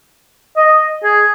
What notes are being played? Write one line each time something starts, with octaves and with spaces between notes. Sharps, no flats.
D#5
G#4